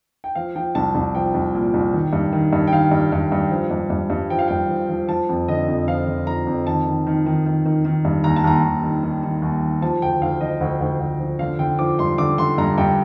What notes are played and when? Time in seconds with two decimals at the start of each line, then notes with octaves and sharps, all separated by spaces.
0.24 G5
0.35 F3 F5
0.55 F3 G5
0.75 C2 A5
0.95 C2
1.15 F3 G5
1.34 C2
1.55 A#2
1.74 C2
1.93 D#3
2.13 G2
2.32 D#3
2.53 G2
2.67 G5
2.72 D#3 F5
2.92 G2
3.12 G2
3.32 G2
3.51 F3
3.71 G2
3.90 G2
4.10 G2
4.30 F3 G5
4.39 F5
4.48 G2 G5
4.69 F3
4.89 F3
5.09 F3 A5
5.29 F2
5.48 D3 D#5
5.68 F2
5.88 F3 F5
6.07 D3
6.27 F3 A#5
6.47 F2
6.67 D#3 A5
6.87 D#3
7.07 D#3
7.26 D#3
7.46 D#3
7.65 D#3
7.85 D#3
8.05 G2
8.24 D#2 A#5
8.36 A5
8.44 D#2 A#5
8.64 D#2
8.83 D#3
9.03 D#3
9.23 D#3
9.42 D#2
9.62 D#3
9.82 F3 A5
10.02 D2 G5
10.21 D2 F5
10.41 F3 D#5
10.61 D2
10.81 D2
11.00 D2
11.20 F3
11.39 D3 F5
11.59 D3 G5
11.79 F3 D6
11.99 G2 C6
12.18 D3 D6
12.38 D3 C6
12.58 G2 A#5
12.78 G2 G5